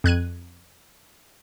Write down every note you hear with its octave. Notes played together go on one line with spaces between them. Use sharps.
F2 F#6 G#6 D#7